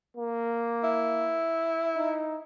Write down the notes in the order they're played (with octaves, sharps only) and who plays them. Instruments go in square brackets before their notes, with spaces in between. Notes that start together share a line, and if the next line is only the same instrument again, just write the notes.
[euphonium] A#3
[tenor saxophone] E4
[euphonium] D#4